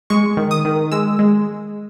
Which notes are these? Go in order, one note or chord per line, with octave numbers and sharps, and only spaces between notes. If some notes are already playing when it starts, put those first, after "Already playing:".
G#3 C#6
D#3
D#6
D#3
G#3 E6
G#3